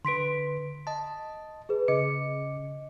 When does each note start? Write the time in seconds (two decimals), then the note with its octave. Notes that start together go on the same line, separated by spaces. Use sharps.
0.05 D3 B4 C6 B6 D7
0.87 D#5 A5
1.69 G#4 B4
1.88 C#3 D#5 D6 C#7